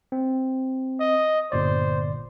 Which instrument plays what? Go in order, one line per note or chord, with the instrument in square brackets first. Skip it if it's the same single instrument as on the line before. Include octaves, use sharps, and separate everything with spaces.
[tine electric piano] C4
[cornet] D#5
[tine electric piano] G1 A#2 D5 [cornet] C5